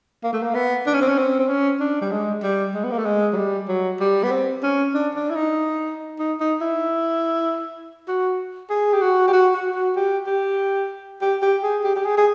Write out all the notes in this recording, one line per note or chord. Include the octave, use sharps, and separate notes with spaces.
A#3
A3
A#3
B3
D4
C#4
C4
C#4
C4
C4
C#4
D4
G3
G#3
G3
G#3
B3
A#3
A3
G#3
F#3
G3
F#3
G3
B3
C4
C#4
D4
D4
E4
D#4
D#4
D#4
E4
F#4
G#4
G4
F#4
G4
F#4
F#4
F#4
G4
G4
G4
G4
G#4
G4
G4
G#4
G#4